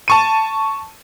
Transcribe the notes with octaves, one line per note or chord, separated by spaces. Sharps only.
A5 C#6 D#7